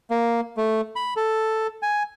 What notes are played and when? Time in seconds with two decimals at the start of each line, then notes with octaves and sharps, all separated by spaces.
0.11 A#3
0.57 A3
0.96 B5
1.17 A4
1.82 G#5